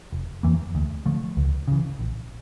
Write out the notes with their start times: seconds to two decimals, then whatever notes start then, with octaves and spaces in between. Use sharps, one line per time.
0.12 F1
0.43 F2 E3 A#3
0.75 D2
1.06 D3 F3 A3
1.37 C#2
1.68 C#3 E3
1.99 A#1